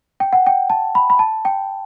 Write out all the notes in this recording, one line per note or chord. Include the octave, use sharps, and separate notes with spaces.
G5
F#5
G5
A5
B5
B5
A5
G5